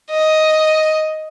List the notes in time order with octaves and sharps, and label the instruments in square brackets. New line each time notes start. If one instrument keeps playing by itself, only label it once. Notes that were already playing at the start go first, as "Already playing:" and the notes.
[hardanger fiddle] D#5